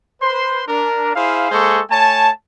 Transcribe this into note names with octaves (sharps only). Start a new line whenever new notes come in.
B4 C5 C6
D4 A#4
E4 G#4 C5 F5
G#3 A#3 G#4 A4 C5 C#6
A3 C#5 G#5 A5